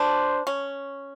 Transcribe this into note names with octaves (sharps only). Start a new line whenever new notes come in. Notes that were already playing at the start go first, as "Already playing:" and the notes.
Already playing: D4 C5
C#4